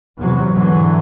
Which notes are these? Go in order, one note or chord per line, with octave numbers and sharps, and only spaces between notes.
E2 C3 F#3
G#2 D3 E3 F#3